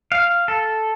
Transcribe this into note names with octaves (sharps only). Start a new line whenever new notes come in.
F5
A4